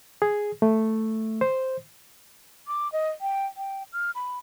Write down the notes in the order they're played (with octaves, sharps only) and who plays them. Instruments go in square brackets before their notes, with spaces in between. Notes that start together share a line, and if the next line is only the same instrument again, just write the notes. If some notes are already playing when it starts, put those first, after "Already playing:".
[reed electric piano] G#4
A3
C5
[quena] D6
D#5
G5
G5
F6
B5